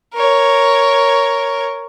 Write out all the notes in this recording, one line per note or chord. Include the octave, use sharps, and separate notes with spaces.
A#4 C#5